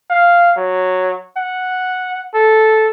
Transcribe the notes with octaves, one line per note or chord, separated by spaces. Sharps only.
F5
F#3
F#5
A4